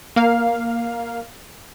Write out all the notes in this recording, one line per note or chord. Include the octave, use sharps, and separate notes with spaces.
A#3 F5